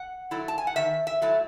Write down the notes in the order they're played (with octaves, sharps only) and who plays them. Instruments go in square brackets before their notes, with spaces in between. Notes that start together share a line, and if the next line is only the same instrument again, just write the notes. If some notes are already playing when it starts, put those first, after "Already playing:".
Already playing: [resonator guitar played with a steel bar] F#5
F#3 A3 E4
A5
G#5
F#5
D#3 E5
E5
F#3 A3 E4